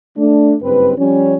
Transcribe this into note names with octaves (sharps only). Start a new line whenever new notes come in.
A3 D4
F#1 G2 C4 B4
F3 G3 C#4